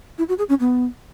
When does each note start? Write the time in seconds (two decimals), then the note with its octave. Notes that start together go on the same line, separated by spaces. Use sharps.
0.18 E4
0.29 F#4
0.38 G#4
0.49 C#4
0.60 B3